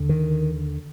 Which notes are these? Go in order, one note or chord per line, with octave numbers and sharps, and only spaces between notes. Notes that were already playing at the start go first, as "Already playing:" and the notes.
Already playing: D#2 D3
D#3